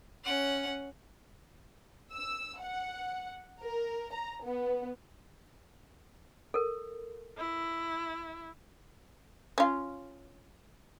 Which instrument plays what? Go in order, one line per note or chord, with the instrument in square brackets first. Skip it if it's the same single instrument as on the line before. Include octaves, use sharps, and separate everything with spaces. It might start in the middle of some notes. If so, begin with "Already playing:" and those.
[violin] C#4 F#5
[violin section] E6
F#5
A#4
A#5
B3
[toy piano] A4 A#4
[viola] E4
[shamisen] C#4 F4